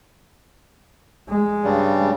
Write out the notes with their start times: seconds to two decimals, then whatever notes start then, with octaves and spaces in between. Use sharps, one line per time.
1.29 G#3
1.64 G2 C#3 G3